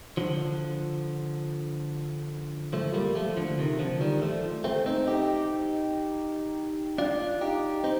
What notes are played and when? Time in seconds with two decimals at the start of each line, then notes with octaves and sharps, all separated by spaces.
0.17 D3 F3
2.73 F3 A3
2.94 G3 A#3
3.15 F3 A3
3.37 D3 F3
3.58 C3 D#3
3.79 D3 F3
4.01 D#3 G3
4.22 F3 A3
4.64 A3 C4
4.86 C4 D#4
5.07 D#4 G4
6.98 D4 F4
7.41 D#4 G4
7.84 C4 D#4